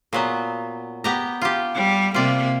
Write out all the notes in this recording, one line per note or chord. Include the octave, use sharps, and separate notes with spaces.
A#2 F#3 B3
B3 G4 A#5
F4 G4
G3
C3 A#3 F4 D5